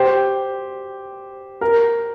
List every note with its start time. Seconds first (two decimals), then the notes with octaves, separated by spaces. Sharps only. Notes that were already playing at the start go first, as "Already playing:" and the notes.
Already playing: G4 C5
1.61 A#4